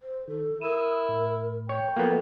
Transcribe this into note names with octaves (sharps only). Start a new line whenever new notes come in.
C5
D#3 A4
E4 A#4 D#6 E6
A2
C#5 G5
F3 F#3 A#3 B3 A4